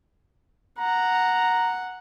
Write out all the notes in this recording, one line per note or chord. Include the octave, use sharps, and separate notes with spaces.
F#5 A#5